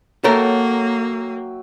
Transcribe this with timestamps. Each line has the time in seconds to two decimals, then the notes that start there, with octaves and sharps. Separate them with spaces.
0.24 F#3 A#3 A4 A#4 C#5 E5 G5